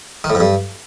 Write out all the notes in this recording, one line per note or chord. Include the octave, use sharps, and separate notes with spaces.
D#3
A2
F2
G2